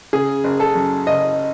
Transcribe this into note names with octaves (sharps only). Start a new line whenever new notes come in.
C#3 G#4
F#1
A4
F#2
F#1 D#5